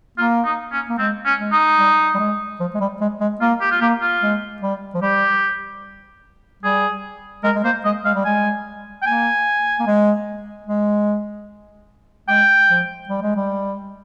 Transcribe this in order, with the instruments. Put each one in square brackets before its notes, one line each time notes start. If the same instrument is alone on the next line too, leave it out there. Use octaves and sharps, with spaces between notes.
[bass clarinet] A#3 [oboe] F4
[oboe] D#4
C#4
[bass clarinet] A#3
[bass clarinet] G#3 [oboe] C4
[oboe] C#4
[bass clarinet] G#3
[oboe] D#4
[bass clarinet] G3
G3
G#3
F3
G#3
G3
G#3
G#3
[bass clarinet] A#3 [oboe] F4
[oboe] G4
F4
[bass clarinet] A#3 [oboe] G4
[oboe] F4
[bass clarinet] G#3
G3
F3
[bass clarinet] G3 [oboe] G4
[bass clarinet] G3 [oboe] G#4
[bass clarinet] G#3 [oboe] A#4
[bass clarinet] G#3
[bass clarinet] A#3 [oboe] C5
[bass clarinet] G#3 [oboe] D#5
[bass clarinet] G#3 [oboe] F5
[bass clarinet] G3
[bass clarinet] G#3 [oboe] G#5
[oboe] G5
[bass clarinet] A#3 [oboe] G#5
[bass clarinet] A#3
G#3
G#3
[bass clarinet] G#3 [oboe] G5
[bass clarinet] F3
G3
G#3
G3